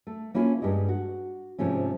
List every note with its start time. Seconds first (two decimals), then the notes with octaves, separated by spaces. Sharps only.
0.07 A3
0.34 A#3 C#4 E4 F4 A4
0.62 G2 G3 G#3 D#5
0.89 F#4
1.59 G#2 C3 F3 A3 C#4